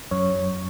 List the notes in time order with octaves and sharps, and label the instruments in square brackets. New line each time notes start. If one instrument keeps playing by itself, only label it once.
[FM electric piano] F#2 C#5